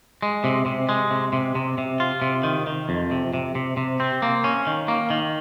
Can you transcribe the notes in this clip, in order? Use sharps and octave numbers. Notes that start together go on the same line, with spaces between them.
G#3
C3
C3
G#3
C3
C3
C3
C3
F4
C3
D#3
D#3
F2
C3
C3
C3
C3
C4
A#3
C#4
D#3
A#3
D#3